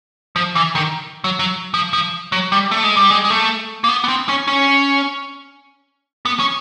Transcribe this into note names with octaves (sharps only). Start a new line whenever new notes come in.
F3
E3
D#3
F#3
F#3
F3
F3
F#3
G3
A3
G#3
G3
G#3
G#3
A3
A#3
B3
B3
C4
C#4
C#4
B3
C#4